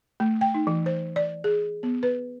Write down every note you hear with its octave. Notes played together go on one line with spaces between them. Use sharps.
A3
G5
D#4
E3
C5
D5
G#4
B3
B4